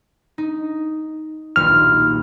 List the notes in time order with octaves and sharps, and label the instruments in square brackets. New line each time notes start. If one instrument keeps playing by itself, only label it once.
[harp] D#4
[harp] D#1 B1 A#2 [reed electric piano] F6